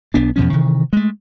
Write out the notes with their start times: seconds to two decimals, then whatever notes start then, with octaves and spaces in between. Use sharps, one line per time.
0.14 B1 B3 D4
0.36 E2 B2 F3 C#4
0.53 C3 D#3 E3
0.93 G#3 A3